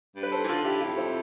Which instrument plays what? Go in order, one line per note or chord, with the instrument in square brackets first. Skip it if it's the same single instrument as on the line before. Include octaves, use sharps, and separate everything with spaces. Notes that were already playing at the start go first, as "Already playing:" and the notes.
[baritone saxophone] G2
[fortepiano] B4
A4 C5
[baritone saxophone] E3
[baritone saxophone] D3 [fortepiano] F4 A4
[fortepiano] E4 G4
[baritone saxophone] F2 [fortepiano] E4 G4
[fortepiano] C4 E4